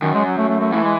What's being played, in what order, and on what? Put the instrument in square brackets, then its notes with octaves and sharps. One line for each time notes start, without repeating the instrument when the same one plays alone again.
[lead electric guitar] F#2 [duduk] D#3
[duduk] G#3
F#3
A3
A3
A3
[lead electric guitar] E3 [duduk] A3
[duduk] G#3